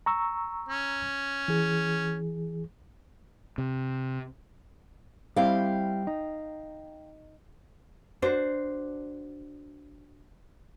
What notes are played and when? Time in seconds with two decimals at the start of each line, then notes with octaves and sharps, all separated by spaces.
0.06 A#5 C#6 E6
0.69 C#4
1.48 E3 G#4
3.58 C3
5.36 G3 C4 E4 F5 G5
6.07 D#4
8.22 D4 F#4 C5